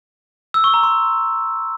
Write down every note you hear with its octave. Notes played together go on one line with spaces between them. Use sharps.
E6
C#6
A#5
C6